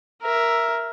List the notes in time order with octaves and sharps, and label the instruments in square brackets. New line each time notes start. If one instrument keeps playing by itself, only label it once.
[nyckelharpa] A#4 E5